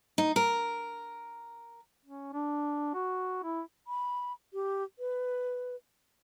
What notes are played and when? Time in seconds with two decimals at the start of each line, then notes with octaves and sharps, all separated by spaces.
0.18 D#4
0.36 A#4
2.05 C#4
2.33 D4
2.94 F#4
3.43 E4
3.87 B5
4.53 G4
4.99 B4